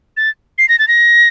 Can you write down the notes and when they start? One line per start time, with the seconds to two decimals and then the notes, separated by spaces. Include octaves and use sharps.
0.17 A6
0.58 C7
0.69 A#6
0.79 A6
0.88 A#6